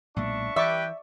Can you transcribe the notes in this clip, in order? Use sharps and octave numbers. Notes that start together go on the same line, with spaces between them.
B1 A#2 G#3 D4 E5 C#6
E3 G3 B4 D5 E5 G5 C#6 D6